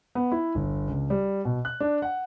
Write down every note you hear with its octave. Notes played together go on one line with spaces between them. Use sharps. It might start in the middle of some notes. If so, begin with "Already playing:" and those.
B3
E4
G1
C#2
G3
B2
F#6
D4
F#5